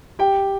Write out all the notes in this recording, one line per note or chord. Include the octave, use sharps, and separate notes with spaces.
G4 G5